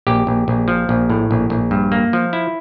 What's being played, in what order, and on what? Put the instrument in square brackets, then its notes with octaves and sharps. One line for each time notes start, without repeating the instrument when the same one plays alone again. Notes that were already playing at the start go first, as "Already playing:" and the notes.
[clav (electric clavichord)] A#1 G4
A#1
A#1
F3
A#1
A2
A#1
A#1
G2
A#3
F3
E4